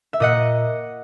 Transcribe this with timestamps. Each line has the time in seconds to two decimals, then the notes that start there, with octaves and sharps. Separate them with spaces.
0.13 E5
0.20 A#2 D#5 F#5